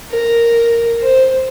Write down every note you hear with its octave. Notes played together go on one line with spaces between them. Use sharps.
A#4
C5